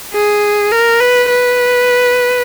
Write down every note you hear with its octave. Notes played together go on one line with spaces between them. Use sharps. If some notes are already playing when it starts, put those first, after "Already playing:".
G#4
A#4
B4
B4